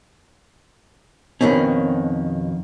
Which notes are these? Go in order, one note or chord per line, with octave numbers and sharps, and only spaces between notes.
F2 B2 D#3 C4 C#4